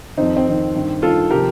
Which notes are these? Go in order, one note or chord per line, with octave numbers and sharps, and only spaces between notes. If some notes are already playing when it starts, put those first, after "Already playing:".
F2 D#3 C4 D#4
C4
F2 D#3
G2 D#3
G2 D#3 F4 A4
C3 F3 G4 A#4